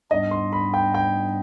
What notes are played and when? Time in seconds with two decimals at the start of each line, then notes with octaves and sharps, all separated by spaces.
0.11 G#2 G3 B3 D4 D#5
0.31 C6
0.53 B5
0.74 G5
0.94 G5